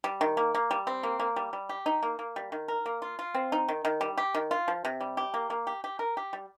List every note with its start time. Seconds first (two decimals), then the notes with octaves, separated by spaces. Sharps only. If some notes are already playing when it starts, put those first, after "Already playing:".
0.04 G3
0.21 D#3
0.37 A#3
0.55 A#3
0.71 G3
0.87 C4
1.03 A#3
1.19 A#3
1.36 G3
1.53 G3
1.69 G4
1.86 D#4
2.03 A#3
2.19 A#3
2.36 G3
2.52 D#3
2.68 A#4
2.86 A#3
3.02 F4
3.19 F4
3.35 C4
3.52 D#4
3.68 D#3
3.85 D#3
4.01 G3
4.18 G4
4.35 D#3
4.51 F4
4.68 F3
4.85 C3
5.01 G3
5.17 G4
5.34 A#3
5.50 A#3
5.67 G4
5.84 G4
5.99 A#4
6.17 G4
6.33 G3